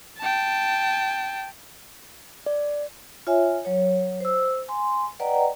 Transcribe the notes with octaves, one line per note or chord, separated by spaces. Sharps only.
G5 A5
D5
F4 C#5 E5 G#5
F#3 C#5
C5 E6
G#5 C6
B4 D5 D#5 F#5 G5 A#5